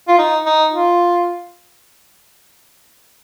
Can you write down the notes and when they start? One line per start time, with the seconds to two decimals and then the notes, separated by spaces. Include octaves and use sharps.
0.08 F4
0.18 D#4
0.45 D#4
0.72 F4